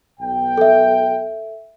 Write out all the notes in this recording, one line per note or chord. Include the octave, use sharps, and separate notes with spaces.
B1 G5
A4 E5